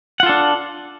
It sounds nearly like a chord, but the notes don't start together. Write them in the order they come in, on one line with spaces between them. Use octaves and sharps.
F#5 F4 A4 D4